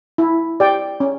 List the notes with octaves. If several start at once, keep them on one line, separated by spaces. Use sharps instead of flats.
E4
G4 D5 G5
C#4